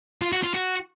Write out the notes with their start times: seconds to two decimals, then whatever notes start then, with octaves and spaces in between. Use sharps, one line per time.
0.22 F4
0.32 F#4
0.43 F4
0.54 F#4